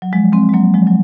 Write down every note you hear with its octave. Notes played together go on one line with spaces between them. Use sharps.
F#3
F3 G#3
G#3 C4
G#3
F#3 A#3
F3 G#3
F#3